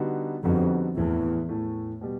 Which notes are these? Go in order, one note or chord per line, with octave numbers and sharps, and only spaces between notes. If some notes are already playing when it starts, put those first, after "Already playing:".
Already playing: D3 G3 B3 D#4 F#4
F2 D3 G3 B3 D#4 F#4
E2 A2 E3 A3
A2 E3 A3
B2 G3